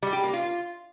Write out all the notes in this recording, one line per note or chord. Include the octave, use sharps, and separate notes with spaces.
G3
G4
A#3
F4